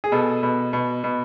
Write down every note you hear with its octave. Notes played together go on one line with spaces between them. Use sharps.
G#4
B2 A4
B2
B2
B2